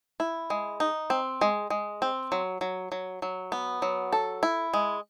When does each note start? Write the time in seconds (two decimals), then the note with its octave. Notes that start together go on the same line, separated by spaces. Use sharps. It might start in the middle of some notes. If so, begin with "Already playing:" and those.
0.20 E4
0.50 G#3
0.80 D#4
1.10 C4
1.41 G#3
1.70 G#3
2.02 C4
2.32 F#3
2.61 F#3
2.92 F#3
3.22 F#3
3.52 B3
3.82 F#3
4.12 A4
4.43 E4
4.74 G#3